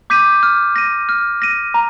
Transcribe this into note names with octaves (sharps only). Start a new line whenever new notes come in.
D6 G6 B6 D#7
F6
A#6 D#7
F6
A#6 D#7
A#5